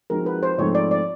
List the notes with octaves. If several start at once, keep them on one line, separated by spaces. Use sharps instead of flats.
F3 G#3 C4 D#4 F#4 A#4
B4
C5
G#2 F3 A3 C4 D#4 C#5
D5
D5